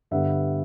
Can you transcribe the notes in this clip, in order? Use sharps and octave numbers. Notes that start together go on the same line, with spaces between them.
G2 D3 G3 B3 E5 F#5